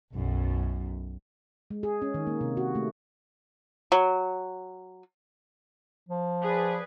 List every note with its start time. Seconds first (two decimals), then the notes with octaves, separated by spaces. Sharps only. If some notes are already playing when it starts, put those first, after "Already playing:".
0.13 B1 F#2
1.71 G#3
1.83 G#4
2.02 C#4
2.14 D#3
2.27 A#3
2.41 C3
2.57 F#4
2.75 A3
3.92 F#3
6.09 F3
6.43 G#4 B4 D5